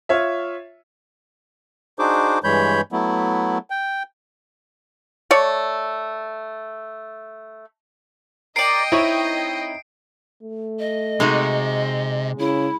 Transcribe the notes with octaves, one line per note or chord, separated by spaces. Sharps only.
F4 C#5 E5
D4 D#4 F#4 G#4 C5 D6
G2 E3 G#3 C#5 B5 G6
F#3 A3 B3 E4
G5
A3 C#5 D5
A#4 D5 D#5 G5 C7 D7
C4 D#4 E4 C#5
A3
D#5
C3 G#3 D#4 F#4
C#3 E4